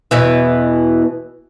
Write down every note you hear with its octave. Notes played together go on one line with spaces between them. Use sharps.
E2 B2 E3